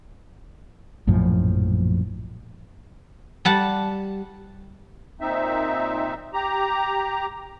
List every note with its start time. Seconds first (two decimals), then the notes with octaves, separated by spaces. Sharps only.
1.07 A#1 F#2 A2 F3
3.45 G3 F#5 A5
5.21 A#2 C4 D#4 E5
6.34 G4 A#5